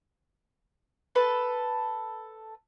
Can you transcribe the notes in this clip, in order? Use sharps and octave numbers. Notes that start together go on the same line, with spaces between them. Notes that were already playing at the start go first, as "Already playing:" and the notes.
A4 B4 A5